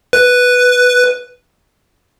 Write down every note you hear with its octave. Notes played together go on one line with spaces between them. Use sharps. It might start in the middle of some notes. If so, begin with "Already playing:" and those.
B4